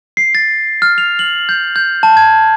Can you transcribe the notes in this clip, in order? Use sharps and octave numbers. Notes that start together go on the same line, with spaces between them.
C7
A6
F6
F7
F#7
G6
G6
A5
G#6